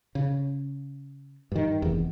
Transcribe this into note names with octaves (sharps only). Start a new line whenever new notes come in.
C#3
G2 D#3
F1 E2